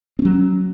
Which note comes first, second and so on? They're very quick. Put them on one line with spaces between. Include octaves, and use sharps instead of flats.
C4 C#4 F#3